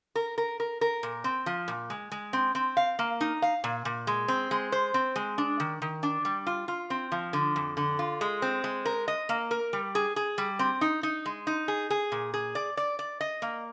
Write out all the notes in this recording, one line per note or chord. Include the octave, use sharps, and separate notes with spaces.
A#4
A#4
A#4
A#4
A#2
C4
F3
A#2
G#3
G#3
C4
C4
F5
A#3
D#4
F5
A#2
A#2
G#3
C4
G#3
C5
C4
G#3
D4
D#3
D#3
D4
G3
F4
F4
C4
F3
D3
F2
D3
F4
G#3
C4
G#3
A#4
D#5
A#3
A#4
G3
G#4
G#4
G3
C4
D#4
D#4
G#3
D#4
G#4
G#4
A#2
G#4
D5
D5
D5
D#5
A#3